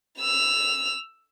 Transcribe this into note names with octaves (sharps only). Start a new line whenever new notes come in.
E6 F7